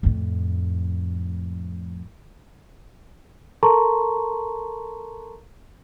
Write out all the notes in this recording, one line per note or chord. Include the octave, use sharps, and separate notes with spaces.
F2 A2
A4 A#4 A5 A#5 C6 C#6